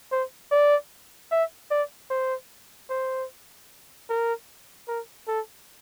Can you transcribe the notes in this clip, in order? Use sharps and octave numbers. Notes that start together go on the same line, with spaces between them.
C5
D5
E5
D5
C5
C5
A#4
A#4
A4